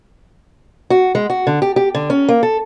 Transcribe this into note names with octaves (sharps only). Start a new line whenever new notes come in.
F#4
G#3
F#4
D3
G4
G4
D3
C#4
A#3
A4